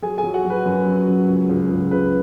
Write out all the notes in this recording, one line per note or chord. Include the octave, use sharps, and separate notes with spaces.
F#3 G#4 G#5
G#4 G#5
F#3
F#4 F#5
F#3
B4
F#2
F#3
F#2
C#2
C#2
C#2
C#2 B4